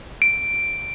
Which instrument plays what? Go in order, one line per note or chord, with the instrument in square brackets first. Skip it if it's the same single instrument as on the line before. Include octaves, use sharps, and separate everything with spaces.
[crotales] D7